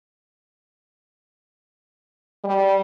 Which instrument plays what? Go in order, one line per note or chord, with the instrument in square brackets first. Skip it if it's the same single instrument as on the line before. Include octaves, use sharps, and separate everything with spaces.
[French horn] G3